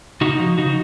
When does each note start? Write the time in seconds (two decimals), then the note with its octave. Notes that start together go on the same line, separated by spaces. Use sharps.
0.21 C#3 D#4 F#4
0.40 F3
0.58 C#3 D#4 F#4